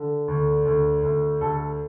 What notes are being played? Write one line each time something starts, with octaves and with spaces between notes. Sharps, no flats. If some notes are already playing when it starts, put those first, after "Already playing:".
Already playing: D3
D2
D2
D2
D2 A4